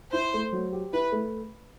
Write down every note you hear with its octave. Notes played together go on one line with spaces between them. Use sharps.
E4 C5
A3
F#3
G4
E4 B4
A3